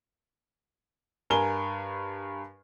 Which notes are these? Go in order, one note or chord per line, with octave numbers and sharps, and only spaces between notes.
G2 A#4 G#5 G7